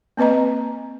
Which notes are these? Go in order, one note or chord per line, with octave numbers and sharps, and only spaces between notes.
A#3 C4 B4 D#5 A#5